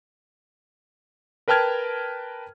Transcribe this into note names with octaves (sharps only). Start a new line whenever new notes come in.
A#4 B4 G5 A5 F6 G#6